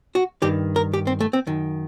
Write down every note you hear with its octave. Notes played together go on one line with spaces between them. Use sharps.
F#4
G2 D#3 G4
A#4
G4
C4
A3
C4
F#2 D#3